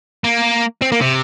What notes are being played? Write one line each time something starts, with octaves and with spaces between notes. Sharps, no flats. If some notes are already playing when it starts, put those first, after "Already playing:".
A#3
C4
A#3
C3